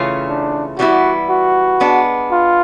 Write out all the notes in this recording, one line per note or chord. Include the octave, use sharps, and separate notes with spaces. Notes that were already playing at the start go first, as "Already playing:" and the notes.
Already playing: C#3 E3 A3 C#4 F4
D4
E3 G3 B3 E4 F#4
F#4
G#3 B3 D4
F4